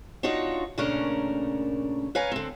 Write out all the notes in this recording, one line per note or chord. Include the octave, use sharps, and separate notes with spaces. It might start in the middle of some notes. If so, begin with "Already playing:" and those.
D4 D#4 F4 F#4 C#5
A#2 C#3 A3 C#4 D4 A#4
B4 C#5 F5 G#5 A#5
D3 C4